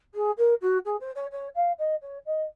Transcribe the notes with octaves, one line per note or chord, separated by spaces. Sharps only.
G#4
A#4
F#4
G#4
C5
C#5
C#5
F5
D#5
C#5
D#5